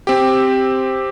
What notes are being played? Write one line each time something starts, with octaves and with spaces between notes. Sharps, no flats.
C4 G4